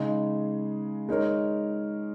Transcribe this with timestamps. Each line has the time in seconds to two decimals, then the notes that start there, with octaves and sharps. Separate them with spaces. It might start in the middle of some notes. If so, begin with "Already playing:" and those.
Already playing: C#3 G#3 D#4 G#4
1.08 G#3 D#4 A#4 C#5